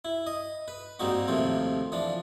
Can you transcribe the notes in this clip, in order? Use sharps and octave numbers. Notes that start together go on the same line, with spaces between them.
E4
D#5
B4
G#2 G3 A#3 C4 D#4 F#4
D#2 A2 C3 F3 A#3 C4
E3 F3 D4